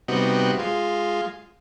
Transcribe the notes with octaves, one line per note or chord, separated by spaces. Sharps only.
C3 G3 B3 D#4 F#4
G#3 F4